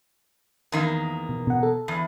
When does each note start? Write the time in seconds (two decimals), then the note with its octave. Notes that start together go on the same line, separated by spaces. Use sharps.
0.72 E2 D#3 A#3
1.29 B2
1.47 B2 F#5
1.63 A4
1.88 E2